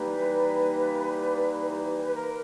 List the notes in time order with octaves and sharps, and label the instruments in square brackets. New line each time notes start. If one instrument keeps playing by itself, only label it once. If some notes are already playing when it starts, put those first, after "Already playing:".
Already playing: [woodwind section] E3 G3 A#3 D#4 [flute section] B4
[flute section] B4
A#4